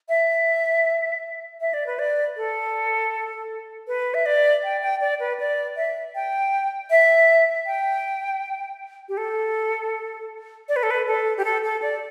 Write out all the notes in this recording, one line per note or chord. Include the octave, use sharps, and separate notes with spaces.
E5
E5
D5
B4
D5
A4
B4
E5
D5
G5
G5
D5
B4
D5
E5
G5
E5
G5
G4
A4
D5
B4
A4
B4
A4
G4
A4
A4
D5